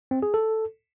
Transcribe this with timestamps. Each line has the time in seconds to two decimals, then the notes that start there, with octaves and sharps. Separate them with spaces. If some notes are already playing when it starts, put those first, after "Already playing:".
0.11 C4
0.23 G#4
0.34 A4